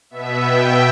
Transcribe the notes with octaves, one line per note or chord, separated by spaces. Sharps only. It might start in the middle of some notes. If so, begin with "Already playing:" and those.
B2 B3 E5
G5